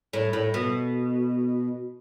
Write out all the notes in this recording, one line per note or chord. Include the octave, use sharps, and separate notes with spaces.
A2
A2
B2